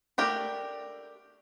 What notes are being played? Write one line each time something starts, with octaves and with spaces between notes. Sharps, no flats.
A3 D4 G4 A#4